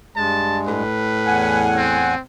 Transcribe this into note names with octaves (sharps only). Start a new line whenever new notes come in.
G2 G#3 A5
A2 B4
E2 F#5 G#5
C4